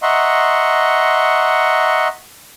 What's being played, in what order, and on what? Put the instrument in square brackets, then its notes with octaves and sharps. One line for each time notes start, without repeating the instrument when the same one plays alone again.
[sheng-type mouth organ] D#5 E5 F#5 A#5 C6 C#6